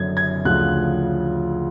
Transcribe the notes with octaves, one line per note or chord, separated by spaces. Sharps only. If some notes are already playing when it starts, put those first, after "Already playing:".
Already playing: F#1 F#2 D3 G#6
G#6
D2 C#3 F3 F#6